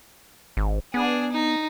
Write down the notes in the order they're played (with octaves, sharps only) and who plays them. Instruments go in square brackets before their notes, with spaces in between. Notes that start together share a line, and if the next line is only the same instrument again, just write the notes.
[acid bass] G#1
[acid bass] B3 [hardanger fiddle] D4 G#4
[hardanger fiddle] D#4